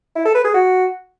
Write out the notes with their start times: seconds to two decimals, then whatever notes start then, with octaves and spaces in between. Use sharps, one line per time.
0.16 E4
0.25 A4
0.35 B4
0.44 G#4
0.54 F#4